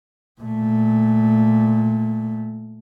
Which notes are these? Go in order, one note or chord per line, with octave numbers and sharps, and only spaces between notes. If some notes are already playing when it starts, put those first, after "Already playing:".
A#2 A3